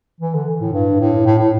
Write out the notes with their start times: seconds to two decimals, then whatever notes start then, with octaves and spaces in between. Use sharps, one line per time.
0.21 E3
0.34 D3
0.61 A2
0.73 G2
1.00 A2
1.26 A2
1.38 A2